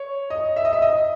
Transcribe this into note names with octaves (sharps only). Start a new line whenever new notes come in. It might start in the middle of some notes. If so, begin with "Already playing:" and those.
Already playing: C#5
D#5
E5
D#5
E5
D#5